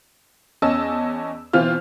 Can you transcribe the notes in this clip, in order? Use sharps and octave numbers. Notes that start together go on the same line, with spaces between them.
E2 C#4 D#5 A5 E6
B2 E3 C4 F4 F6